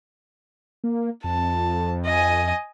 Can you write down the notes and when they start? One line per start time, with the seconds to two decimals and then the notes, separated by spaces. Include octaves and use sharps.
0.84 A#3
1.24 F2 A5
2.05 D#5 G#5